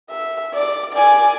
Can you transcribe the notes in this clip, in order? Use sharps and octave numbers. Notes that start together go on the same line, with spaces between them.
E5
D5
D5 G#5